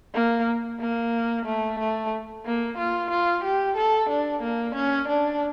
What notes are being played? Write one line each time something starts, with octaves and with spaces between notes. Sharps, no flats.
A#3
A#3
A3
A3
A#3
F4
F4
G4
A4
D4
A#3
C#4
D4